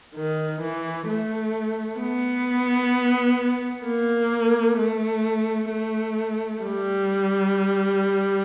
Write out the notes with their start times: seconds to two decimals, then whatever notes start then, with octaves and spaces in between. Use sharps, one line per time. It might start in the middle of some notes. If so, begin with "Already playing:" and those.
0.15 D#3
0.61 E3
1.08 A3
2.00 B3
3.86 A#3
4.79 A3
5.71 A3
6.63 G3